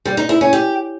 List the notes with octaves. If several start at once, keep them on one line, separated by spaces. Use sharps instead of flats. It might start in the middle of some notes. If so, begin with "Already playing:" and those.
G3
D#4
E4
C#4
G4